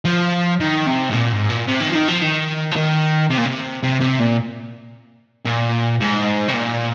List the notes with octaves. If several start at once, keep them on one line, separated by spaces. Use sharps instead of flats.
F3
D#3
C3
G#2
A#2
G#2
A#2
C3
D#3
F3
D#3
F3
D#3
F3
D#3
C3
A#2
C3
C3
C3
A#2
A#2
G#2
C3
A#2